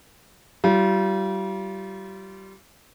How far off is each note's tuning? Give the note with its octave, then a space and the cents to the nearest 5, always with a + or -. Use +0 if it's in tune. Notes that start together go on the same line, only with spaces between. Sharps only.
G3 -30 F4 -30